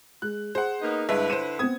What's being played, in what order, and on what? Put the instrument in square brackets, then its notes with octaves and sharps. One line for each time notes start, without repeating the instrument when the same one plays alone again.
[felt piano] G#3 [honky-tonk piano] F#6
[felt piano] G#4 [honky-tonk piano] C5 F#5
[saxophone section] A#3 B3 D#4
[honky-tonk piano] G2 G#3 E5 [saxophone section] D3 E4 B4
[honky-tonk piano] C5 D#7 [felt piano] C#7 E7
[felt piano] B3 C4 [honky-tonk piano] D#6 G#6